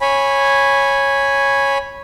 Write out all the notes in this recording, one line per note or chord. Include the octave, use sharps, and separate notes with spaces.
C#5 G#5 B5